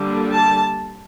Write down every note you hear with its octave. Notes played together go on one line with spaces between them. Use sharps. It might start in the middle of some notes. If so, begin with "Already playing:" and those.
Already playing: D3 G3 A#3 D4
A5